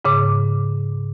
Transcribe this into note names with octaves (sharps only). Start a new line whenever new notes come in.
G#2 C#3 D6